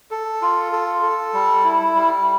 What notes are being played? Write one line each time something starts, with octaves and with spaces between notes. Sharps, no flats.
A4
F4
A4
A4
G3
E4
G3